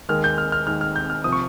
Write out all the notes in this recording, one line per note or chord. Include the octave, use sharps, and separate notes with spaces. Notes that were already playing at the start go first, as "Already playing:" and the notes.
D#2 D#3 G#3 F6
G6
F6
F6
D#2 D#3 G#3 F6
F6
G6
F6
C3 F3 D#6
C#6